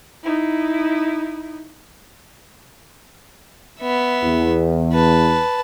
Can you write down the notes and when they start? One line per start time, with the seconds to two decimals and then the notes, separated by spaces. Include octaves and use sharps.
0.24 D#4 E4
3.80 B3 E5
4.23 E2
4.92 B4 A5